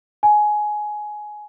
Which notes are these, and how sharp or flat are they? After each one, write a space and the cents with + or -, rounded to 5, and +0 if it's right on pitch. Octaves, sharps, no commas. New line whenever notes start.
G#5 +15